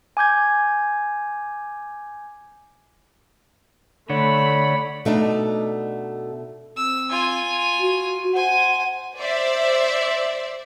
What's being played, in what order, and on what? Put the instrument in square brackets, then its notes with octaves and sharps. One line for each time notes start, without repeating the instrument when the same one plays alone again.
[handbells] G#5 D6 G6 G#6
[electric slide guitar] D3 [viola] A3 B5 [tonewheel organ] C#5 D5 F#5
[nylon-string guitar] B2 A3 D4 D#4
[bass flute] C4 [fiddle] E6
[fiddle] F4 G#5
[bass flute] F#4
[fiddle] C5 G#5 [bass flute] F#5
[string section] C5 D5 E5